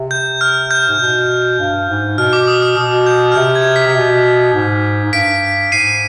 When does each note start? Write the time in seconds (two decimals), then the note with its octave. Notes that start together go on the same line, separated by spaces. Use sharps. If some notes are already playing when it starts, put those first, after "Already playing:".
Already playing: C3
0.11 G6
0.41 F6
0.71 G6
0.88 G#2
1.00 B2
1.59 G2
1.89 G#2
2.18 B2 F6
2.33 D6
2.48 D#6
2.62 F6
2.77 B2 D#6
3.06 G6
3.32 F6
3.36 C3 G6
3.55 G#6
3.76 B6
3.87 C3
3.95 B2
4.54 G#2
5.05 G#2
5.13 G2 B6 D7
5.72 G#2 C7 D#7